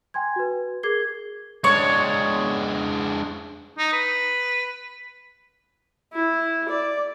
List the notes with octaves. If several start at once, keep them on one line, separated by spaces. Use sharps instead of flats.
G5 G#5 C6 G#6
F#4 B4
G#4 A#4 D6 G#6 C7 G7
G#3 D4 C#5
D#4
B4
E4
D5